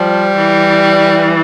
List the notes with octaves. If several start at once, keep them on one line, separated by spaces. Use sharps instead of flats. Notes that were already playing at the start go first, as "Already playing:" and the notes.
Already playing: F3 G3
E3